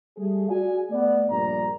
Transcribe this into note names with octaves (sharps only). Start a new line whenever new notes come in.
G3 A3 G#4
F#4 G#4 D5 F5 G#5
A3 B3 D5
A#1 G2 G3 D5 A#5